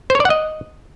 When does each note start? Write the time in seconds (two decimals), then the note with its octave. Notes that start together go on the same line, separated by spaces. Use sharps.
0.10 C5
0.15 C#5
0.20 D5
0.25 F#5
0.30 D#5